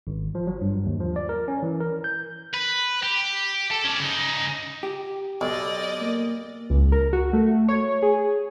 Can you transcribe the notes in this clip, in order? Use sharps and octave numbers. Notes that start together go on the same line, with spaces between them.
G#1
F3
F#3
G2
D#2
F3
D5
A#4
C#4
E3
A#4
G6
B4
G4
A4
C#4 D5
C#3 D#4
G4
B1 D5 D#5
A#3
C#2
A#4
F#4
A3
C#5
G#4